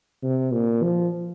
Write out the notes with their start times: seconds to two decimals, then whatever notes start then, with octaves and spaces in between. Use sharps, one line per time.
0.23 C3
0.53 A#2
0.83 F3